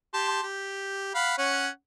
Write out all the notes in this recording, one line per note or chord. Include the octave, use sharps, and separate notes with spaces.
G4 A5 C6
G4
F5 F#5 B5
C#4 C#5 F#5